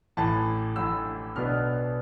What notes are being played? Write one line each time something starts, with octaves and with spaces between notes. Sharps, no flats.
A1 A2 E3 A5
A1 A2 E3 E6
B1 B2 B3 D4 F6